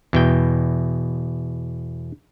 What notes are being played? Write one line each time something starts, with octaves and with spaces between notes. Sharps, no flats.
E2 B2 G5